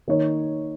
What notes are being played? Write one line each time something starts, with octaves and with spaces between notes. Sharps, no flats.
D#3 A#3 D#4 C#5